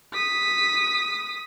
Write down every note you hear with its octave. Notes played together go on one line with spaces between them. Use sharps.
D#6 B6